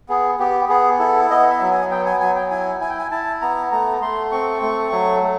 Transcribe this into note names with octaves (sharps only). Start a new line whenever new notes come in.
B3 G#4
B3 G4
B3 G#4
E4 A4
B3 D#5
E5
F#3
G#5
B3 G5
G#5
F#3 G#5
G5
E4 G#5
E4 G#5
G5
G#5
E4 A5
B3 A#5
A3 A#5
A3 C6
C4 C#6
A3
F#3
A3